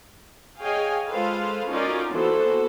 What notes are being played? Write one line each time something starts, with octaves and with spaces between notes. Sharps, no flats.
G#4 C#5 D#5 F5 G5 G#5
G#3 F4 A4 B4 C5 F5
C#4 D#4 F4 F#4 A#4 D5
E3 A#3 B3 F#4 A4 C5